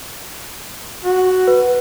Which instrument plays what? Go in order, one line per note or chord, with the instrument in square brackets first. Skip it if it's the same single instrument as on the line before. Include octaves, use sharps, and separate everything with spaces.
[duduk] F#4
[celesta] B4